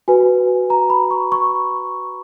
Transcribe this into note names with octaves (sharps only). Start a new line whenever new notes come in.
F#4 B4 G#5
A#5
B5
C#6
C#6